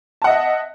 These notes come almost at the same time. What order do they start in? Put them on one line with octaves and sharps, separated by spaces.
A5 F#5 D#5 E5